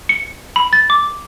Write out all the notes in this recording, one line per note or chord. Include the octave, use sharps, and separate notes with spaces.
C#7
B5
A6
D6